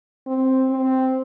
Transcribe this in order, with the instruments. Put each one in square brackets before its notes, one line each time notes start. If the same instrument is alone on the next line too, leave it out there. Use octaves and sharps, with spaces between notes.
[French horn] C4
C4